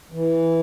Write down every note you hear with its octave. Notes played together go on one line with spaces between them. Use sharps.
E3